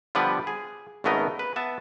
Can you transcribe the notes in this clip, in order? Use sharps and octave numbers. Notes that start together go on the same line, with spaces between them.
D3 F3 G3 B3 B4 D5
G#4
G#1 C#3 A3 B3 A#4 D#5
B4
B3 E5 A5